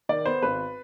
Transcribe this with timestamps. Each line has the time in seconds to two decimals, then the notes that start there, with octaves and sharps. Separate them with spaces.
0.09 D#3 D5
0.26 B3 C5
0.42 G#1 B4